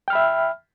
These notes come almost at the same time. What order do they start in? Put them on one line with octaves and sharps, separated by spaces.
G5 F6 B5 E5